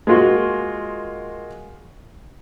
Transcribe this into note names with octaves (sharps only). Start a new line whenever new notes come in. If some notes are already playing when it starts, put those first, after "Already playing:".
G#3 A#3 F4 F#4